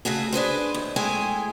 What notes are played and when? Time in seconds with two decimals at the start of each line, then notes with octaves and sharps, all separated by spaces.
0.05 C#3 A3 F#4 G#4
0.32 D4 G#4 B4 C5
0.74 D#2
0.96 G#3 A3 E4 G#4 G5 G#5